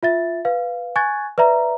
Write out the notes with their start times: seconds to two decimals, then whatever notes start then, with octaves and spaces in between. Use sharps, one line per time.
0.03 F4 E5 A6
0.45 B4 F5
0.96 G#5 C#6 F#6 G#6 A6
1.38 B4 D5 E5 A#5